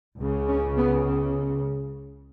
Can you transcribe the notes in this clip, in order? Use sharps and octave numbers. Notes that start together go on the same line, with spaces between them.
C#2 C#3
C#4
B3